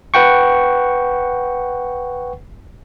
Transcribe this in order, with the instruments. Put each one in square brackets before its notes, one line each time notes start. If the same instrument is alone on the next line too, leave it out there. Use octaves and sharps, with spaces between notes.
[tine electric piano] B4 F#5 G5 C#6